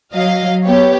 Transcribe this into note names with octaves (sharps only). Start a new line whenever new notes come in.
F#3 D#5 F5
B3 G4 C#5